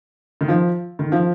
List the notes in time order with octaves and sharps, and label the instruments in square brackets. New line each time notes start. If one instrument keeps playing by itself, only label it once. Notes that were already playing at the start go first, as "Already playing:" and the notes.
[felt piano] D#3
F3
D#3
F3